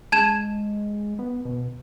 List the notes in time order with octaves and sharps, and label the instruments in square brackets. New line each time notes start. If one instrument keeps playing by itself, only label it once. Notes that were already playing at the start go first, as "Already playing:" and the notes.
[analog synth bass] G#3 [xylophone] A5 G#6 E7
[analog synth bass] B3
B2